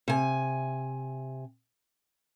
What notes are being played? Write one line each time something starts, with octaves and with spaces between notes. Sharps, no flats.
C3 G#5